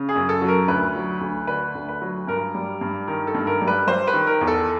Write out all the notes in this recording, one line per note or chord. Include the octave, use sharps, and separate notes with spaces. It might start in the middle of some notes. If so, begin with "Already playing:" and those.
Already playing: C#3
G#4
F#2
A4
F#3
A#4
D2 B4
F#3
D2
D3 B4
D2
B4
F#3
G2 A#4
G3
G2
D#3 A#4
A4
G2
A#4
G3
B4
G3 C5
B4
D#3
A#4
E2
A4